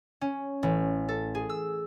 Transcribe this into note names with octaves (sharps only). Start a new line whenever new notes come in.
C#4
A1
A4
G#4
E6